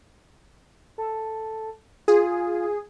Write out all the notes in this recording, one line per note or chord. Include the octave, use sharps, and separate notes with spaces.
A4
F4 G#4